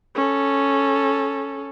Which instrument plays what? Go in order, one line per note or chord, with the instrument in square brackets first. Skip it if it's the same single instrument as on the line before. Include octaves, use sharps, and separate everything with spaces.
[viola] C#4 A4